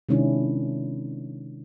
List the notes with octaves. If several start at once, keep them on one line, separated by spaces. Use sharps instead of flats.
C3 D#3 G#3 C#4 D4 E4